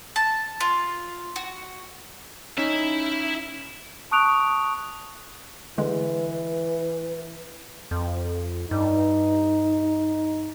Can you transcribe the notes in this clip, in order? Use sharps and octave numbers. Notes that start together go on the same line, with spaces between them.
A5
F4
F#4
C#4 D#4 E4 E5
A5 C#6 D#6 F#6 D7 F7
D3 E3 G#3 B4
F2
G2 D#4